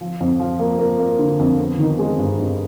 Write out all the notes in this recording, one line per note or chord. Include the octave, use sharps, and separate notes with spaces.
F3
F2
F3
A#3
A#3
A#3
D3
F2
B3
D#3
G#3
G2
G2